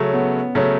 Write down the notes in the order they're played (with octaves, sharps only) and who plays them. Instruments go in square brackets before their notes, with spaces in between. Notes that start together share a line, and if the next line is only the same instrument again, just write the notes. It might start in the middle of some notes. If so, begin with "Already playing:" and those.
Already playing: [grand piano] C#3 F#3 A3 [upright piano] C#4
[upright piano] B3
[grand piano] C#3 F#3 A3 [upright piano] C#4